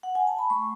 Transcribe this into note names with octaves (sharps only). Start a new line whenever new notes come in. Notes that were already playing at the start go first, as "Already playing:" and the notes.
F#5
G#5
A5
B5
A3 C#6